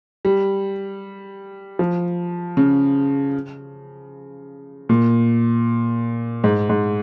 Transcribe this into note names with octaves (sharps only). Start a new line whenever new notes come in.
G3
F3
C#3
A#2
G#2
G#2